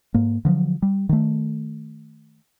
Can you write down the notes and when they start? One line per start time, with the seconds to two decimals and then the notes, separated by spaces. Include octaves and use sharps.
0.14 G#2 A#3
0.45 D3 F3 F#3
0.82 G3
1.09 D#3 A3